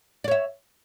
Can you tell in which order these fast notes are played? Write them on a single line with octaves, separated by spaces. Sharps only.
D5 C#5 E5